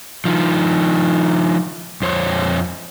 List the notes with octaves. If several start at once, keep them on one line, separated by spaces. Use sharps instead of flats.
D#3 F3
F2 C5 C#5